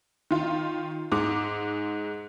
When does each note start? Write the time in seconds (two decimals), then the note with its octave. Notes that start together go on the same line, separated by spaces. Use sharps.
0.31 D#3 F4
1.12 G#2 G#3 D6